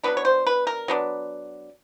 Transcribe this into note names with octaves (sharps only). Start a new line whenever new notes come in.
F#3 B3 D4 B4
C#5
C5
B4
A#4
F#3 B3 D4